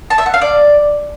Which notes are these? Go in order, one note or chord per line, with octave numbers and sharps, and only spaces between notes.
A5
E5
F#5
F5
D5